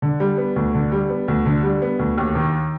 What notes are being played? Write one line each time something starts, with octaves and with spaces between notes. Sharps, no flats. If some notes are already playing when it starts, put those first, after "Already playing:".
D3
G3
B3
D2
D3
G3
B3
D2
D3
G3
B3
D2
D#2
D#3